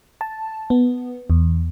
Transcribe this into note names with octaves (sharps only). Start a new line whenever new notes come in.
A5
B3
E2